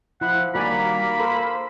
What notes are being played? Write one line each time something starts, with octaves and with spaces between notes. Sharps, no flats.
F3 E4 F#5 B5
D#3 G3 A#3 F#4 A#4 D5 G#5 B5
A4 A#4 C5